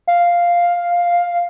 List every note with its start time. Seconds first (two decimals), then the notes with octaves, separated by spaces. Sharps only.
0.07 F5